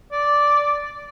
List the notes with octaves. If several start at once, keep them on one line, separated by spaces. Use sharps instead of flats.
D5